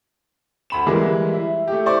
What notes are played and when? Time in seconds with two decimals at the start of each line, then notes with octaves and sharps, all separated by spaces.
0.70 D2 B5 E7
0.87 E3 G3 G#3 A#3
1.33 E4
1.68 A3 G4
1.86 E4 C5 D5 C#6